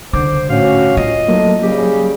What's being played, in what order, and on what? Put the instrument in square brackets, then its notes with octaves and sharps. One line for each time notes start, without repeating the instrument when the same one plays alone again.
[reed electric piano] C#2 D6 [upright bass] D3 [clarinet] C5
[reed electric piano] A2 [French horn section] C#4 F#4 [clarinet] F5
[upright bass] F4 [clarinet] D#5
[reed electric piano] F#3 A#3 [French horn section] A3 D#4
[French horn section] C#3 G3 G#4 [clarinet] G4